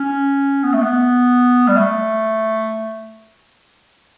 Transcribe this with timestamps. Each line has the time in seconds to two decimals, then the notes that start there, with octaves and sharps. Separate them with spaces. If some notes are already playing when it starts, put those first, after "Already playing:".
Already playing: C#4
0.64 B3
0.73 A3
0.82 B3
1.68 G3
1.77 A3